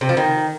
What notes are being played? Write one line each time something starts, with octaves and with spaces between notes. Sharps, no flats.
C3
F3
D#3